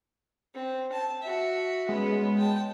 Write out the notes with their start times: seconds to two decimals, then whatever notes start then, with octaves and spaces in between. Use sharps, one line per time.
0.55 C4
0.92 A5
1.22 F#4 E5
1.89 G#3 B3 C#4
2.37 G5 A5